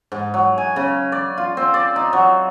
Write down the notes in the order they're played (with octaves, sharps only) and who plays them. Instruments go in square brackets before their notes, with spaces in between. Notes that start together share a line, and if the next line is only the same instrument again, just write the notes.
[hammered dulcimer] G#2
F#3
G#5
C#3
D5
F4
C4
D5
D#4
F#3